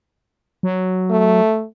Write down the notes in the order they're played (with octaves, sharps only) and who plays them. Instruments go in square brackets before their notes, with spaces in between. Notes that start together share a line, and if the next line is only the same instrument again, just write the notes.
[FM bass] F#3
[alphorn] A3